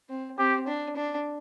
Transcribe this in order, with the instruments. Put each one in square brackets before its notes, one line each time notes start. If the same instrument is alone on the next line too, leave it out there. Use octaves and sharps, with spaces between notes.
[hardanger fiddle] C4
[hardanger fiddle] C4 [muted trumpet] G4
[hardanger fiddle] D4
D4